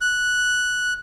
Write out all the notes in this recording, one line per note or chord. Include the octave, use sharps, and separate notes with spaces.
F#6